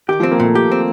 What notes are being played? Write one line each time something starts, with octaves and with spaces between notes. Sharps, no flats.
D#3 G4
F3
C4
A#3
A#2 A3
G4
C4